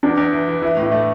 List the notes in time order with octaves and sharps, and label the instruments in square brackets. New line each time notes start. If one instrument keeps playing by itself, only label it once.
[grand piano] E2 [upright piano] D4
[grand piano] E2
E3
E3
[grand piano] E3 [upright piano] E4
[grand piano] A2
[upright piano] E4
[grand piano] A3